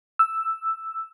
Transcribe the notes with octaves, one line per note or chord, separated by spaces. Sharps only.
E6